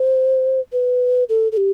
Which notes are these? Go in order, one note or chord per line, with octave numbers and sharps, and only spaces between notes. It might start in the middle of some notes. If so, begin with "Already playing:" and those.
Already playing: C5
B4
A4
A4
G4